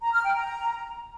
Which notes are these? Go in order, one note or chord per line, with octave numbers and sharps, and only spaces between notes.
A#5
F6
G5
A#5